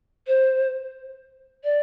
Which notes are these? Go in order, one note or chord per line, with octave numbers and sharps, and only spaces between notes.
C5
D5